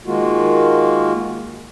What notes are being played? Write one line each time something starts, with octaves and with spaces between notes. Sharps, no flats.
D#3 G#3 A#3 F4 F#4